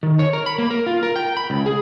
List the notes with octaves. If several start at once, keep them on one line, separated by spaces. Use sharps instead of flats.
D#3
C#5
A#4
B5
A#3
A#4
F4
A#4
G5
B5
C#2
G#4